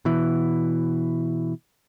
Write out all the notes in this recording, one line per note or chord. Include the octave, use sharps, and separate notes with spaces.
B2 E3